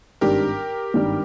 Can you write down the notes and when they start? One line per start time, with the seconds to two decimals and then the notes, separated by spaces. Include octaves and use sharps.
0.21 G#1 G2 D#3 G3 D4 G4 A#4
0.94 G#1 G2 D#3 G3 D4